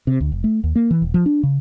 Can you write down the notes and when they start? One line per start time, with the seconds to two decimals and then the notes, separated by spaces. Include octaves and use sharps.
0.07 C3
0.21 D2
0.32 F1
0.44 A3
0.64 D#2
0.76 A#3
0.91 E3
1.02 D#1
1.14 F3
1.26 D4
1.43 C#3